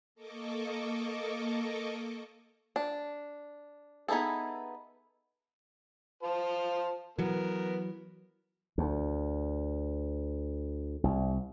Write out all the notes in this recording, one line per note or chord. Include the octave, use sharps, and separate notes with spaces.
A#3 A4 D#5 C#6 D6
D4
B3 D#4 E4 G#4 A4
F4 C5 A5
E3 F#3 B3 A#4
D2
C2